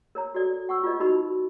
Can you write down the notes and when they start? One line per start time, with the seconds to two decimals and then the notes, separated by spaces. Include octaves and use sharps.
0.15 A#4 C#5 A#5
0.34 F#4 A4 D5
0.69 F#5 C#6 E6
0.84 F4 G4 B4 D5 D#5
1.00 D#4 F#4 A#4 D#5 B5